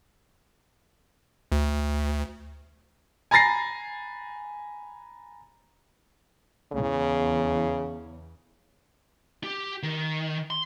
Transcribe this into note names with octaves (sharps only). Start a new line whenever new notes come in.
D2
G#5 A#5 B5 A6 A#6 C7
E2 C#3
G4
D#3
C6